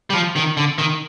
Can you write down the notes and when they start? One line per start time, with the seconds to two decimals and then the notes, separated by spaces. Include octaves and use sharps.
0.10 G3
0.14 F3
0.36 D#3
0.57 D3
0.78 D#3